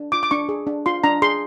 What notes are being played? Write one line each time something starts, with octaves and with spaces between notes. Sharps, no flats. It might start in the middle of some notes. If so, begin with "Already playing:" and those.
Already playing: D4
F4 D6
D6
D4 C#6
G#4
D4
F4 C6
D4 A#5
G#4 C6